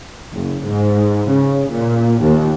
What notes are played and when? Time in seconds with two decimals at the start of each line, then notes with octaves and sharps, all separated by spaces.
0.33 F#1
0.65 G#2
1.29 C#3
1.71 A#2
2.22 D#2